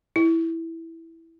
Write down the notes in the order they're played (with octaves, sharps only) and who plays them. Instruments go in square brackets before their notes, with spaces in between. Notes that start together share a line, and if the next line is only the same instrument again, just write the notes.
[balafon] E4